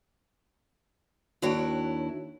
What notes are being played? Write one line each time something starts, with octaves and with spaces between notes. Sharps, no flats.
D#2 D4 E4 F#4 C#5 G5